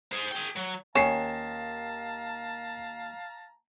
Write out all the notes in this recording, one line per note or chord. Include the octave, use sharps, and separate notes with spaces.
G#4 C5
G#4 G5
F#3
D#2 D#3 C#4 F5 A5 A#5 C7 E7